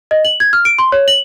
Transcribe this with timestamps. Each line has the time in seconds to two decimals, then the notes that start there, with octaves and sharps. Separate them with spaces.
0.11 D#5
0.25 F#7
0.40 G#6
0.53 F6
0.65 D7
0.79 C6
0.92 C#5
1.08 F#7